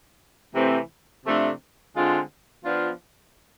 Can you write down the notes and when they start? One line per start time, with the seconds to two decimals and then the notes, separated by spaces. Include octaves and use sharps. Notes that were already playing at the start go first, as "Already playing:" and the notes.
0.54 C3 E3 A3 C4
1.24 C3 F3 A3 D4
1.95 D3 G#3 C4 F4
2.65 F3 B3 D4 F4